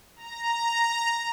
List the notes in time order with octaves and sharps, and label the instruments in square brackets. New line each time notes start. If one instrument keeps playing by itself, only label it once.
[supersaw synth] A#5